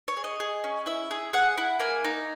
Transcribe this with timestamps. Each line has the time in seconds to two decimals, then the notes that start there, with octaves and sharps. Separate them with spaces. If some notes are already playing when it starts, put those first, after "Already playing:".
0.08 C#5
0.17 G#4
0.24 D#5
0.40 G#4
0.64 C#4
0.86 E4 E5
1.11 G#4
1.33 G#4 F#5
1.58 E4
1.80 A#3 G#5
2.04 D#4